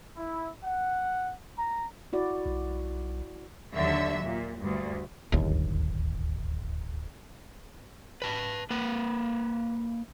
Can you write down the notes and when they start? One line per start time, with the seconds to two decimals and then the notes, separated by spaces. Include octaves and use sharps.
0.16 E4
0.64 F#5
1.57 A#5
2.13 E4 F#4 D5
2.46 B1
3.75 D#2 D3 F#3 E5
4.25 A#2
4.60 D2 G2
5.32 D1 G1 D#2
8.22 B4 A5
8.70 A#3 B4